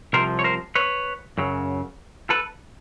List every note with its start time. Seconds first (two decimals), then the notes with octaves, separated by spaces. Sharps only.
0.13 C2 C3 F3 A#4 C5
0.39 C#5
0.44 A#4 C5
0.75 B4 C#5
1.38 F#2 C#3 F#3
2.30 A4 B4